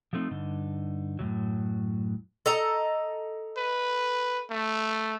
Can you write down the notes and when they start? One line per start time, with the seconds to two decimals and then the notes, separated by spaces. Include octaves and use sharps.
0.13 F3 F#3 A3 C4 D#4
0.31 G2 D3 D#4
1.19 F#2 A2 C#3 F#3
2.46 A4 D#5 A#5
3.57 B4
4.50 A3